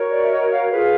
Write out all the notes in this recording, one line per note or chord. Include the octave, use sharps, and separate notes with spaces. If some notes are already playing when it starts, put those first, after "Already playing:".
Already playing: F#4 A#4 C#5
D5
E5
D#5
F5
F4 G#4 B4